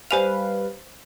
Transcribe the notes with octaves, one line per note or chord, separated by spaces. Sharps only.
G3 B4 C5 F5 G#5 F7